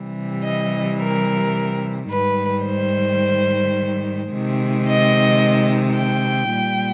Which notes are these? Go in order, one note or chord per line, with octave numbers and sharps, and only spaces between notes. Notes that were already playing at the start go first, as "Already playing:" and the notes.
Already playing: C3 E3 G3
D#5
A#4
G#2 D#3 G3 B4
C5
C3 D#3 G#3
D#5
G5
A#2 G3